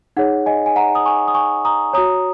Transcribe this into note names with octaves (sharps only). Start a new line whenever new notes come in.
D#4 G#4 C#5 F#5
D#5 G#5
G#5
F#5 A#5
D#6
G#5 C#6
D#6
G#5 C#6
A#5 D#6
F#4 C#5 A#5 D#6